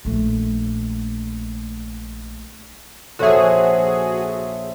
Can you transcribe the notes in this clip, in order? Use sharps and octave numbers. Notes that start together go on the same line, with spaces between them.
A#1 A3
A#1 F#4 G#4 A4 C#5 E5